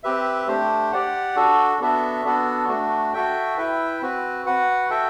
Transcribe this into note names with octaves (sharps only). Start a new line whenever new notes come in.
C4 G4 B4 E5
A3 D4 G4 C5
G4 D5 F#5
D4 F#4 A4
B3 D4 F#4 A4 E5
B3 D4 F#4 A4
A3 D4 F#4
F#4 A4 E5 G5
E4 B4 E5 G5
C4 F#4 B4
F#4 B4 F#5
F#4 A4 E5 G5